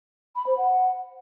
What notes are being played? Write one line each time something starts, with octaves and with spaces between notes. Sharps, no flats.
B5
C5
F#5